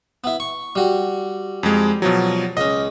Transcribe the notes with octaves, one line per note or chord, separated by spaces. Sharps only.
B3 E4
C#6
G3 F#4
F2 G#3
B2 F3 F#3
C#2 C#4 D#5